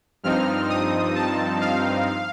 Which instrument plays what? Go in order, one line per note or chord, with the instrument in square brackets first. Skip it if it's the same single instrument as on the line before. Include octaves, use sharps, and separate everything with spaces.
[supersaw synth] G2 F3 C4 D#4 F6
D#6
A5
F5